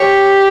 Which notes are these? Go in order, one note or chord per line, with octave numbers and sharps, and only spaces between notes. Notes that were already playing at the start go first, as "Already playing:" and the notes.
Already playing: G4 C#5